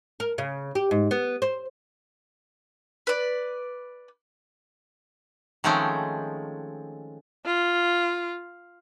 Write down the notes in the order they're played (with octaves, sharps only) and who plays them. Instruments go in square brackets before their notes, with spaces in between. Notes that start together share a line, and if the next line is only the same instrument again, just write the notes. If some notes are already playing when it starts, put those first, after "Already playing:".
[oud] A#4
C#3
G4
G#2
B3
C5
[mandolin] B4 D5
[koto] D#3 F3 G#3 A3 C4 C#4
[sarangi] F4